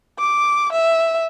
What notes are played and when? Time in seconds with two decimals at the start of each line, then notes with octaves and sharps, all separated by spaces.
0.18 D6
0.72 E5